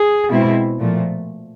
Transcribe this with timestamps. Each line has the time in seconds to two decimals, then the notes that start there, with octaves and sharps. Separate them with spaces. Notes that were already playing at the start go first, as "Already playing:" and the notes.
Already playing: G#4
0.30 B2 G#3 C4 E4
0.79 A#2 F3 A3